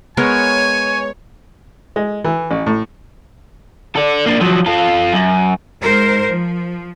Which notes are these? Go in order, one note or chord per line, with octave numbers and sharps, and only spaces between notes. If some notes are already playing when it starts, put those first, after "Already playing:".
G#3 B3 A#4 C#5 G#5
G#3
E3
A1
A2
A4 D5
A#3 D4
F3 F#3
F4 A4
F#2
G#2 A#4 C5
F3